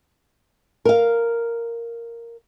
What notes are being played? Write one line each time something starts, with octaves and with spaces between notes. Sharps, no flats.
A#4 F5